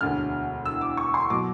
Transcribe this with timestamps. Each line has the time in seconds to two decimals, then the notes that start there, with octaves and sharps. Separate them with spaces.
0.01 E1 D2 D3 F6
0.65 E6
0.81 D6
0.97 C#6
1.14 C6
1.30 B2 F#3 D6